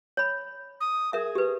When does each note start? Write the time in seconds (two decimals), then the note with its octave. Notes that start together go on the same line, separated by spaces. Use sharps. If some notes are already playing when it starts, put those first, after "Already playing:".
0.17 C#5 B5
0.80 D#6
1.13 G#4 A#4 E5
1.35 G4 B4